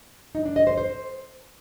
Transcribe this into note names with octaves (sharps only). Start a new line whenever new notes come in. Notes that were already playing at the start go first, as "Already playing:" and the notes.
D#4
D4
D#5
C5
C5